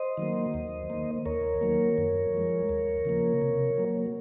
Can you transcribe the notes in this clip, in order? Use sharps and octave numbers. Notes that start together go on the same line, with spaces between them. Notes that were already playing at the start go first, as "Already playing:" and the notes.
Already playing: C5 D#5
D#3 F#3 A#3
D#2
D#3 A#3
D#2 A#4 C#5
D#3 F#3 A#3
F#2
F3 G#3
D#2
C#3 F3 A#3
C3
F#3 A#3